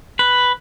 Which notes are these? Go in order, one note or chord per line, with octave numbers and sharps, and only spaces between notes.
B4